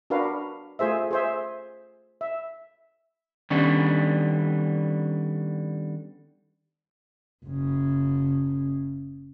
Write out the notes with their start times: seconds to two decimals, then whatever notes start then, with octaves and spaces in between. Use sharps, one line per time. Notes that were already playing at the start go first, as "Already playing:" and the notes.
0.10 D4 F#4 A#4 B4 F5
0.79 A3 F4 G#4 C5 E5
1.11 G#4 C5 E5
2.21 E5
3.50 D3 D#3 G3 B3 C#4
7.46 F#1 C#3